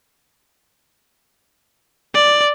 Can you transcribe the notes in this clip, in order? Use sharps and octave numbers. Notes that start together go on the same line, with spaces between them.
D5